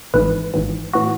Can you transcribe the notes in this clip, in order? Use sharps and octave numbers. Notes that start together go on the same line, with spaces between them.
G#1 G#2 E3 B4
G#1 G#2 E3
A2 E3 F#4